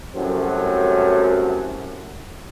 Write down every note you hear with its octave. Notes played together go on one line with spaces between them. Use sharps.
C2 F#2 F#3 A3 C4